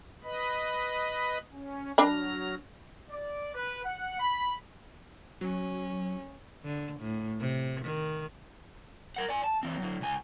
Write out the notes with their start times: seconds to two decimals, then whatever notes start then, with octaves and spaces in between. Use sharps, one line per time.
0.24 B4 D#5 B5
1.52 C#4
1.98 F#3 D4 B5 F6 A#6
3.09 D5
3.54 B4
3.85 F#5
4.20 B5
5.41 F#3 C#4
6.64 D3
7.00 A2
7.39 C3
7.86 D#3
9.16 A#4 F#5
9.29 D5 G#5
9.44 A5
9.63 E3 C4
9.78 D3 F#3
10.01 C#2 G#5